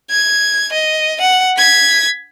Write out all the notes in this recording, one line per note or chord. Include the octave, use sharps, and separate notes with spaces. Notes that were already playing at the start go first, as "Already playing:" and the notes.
G#6
D#5
F#5
G#6 B6